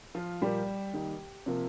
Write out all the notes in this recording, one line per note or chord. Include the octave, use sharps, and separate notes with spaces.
F3 F4
A#2 F3 G3 A#3 G4
D#3 G3 A#3
C3 F3 A#3